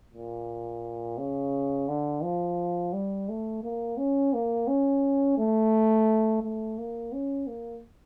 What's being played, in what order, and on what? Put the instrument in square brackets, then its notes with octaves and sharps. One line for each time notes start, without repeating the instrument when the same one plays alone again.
[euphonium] A#2
C#3
D3
F3
G3
A3
A#3
C#4
A#3
C#4
A3
A3
A#3
C#4
A#3